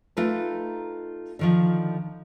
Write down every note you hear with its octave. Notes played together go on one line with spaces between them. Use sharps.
A3 D#4 F4 A#4 B4
D3 D#3 F3